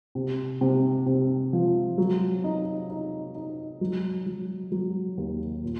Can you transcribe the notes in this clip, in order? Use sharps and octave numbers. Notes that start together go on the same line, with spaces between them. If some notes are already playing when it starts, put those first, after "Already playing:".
C3
C3
C3
F3
F#3
D#4
D#4
D#4
F#3
F#3
F#3
D#2
A#2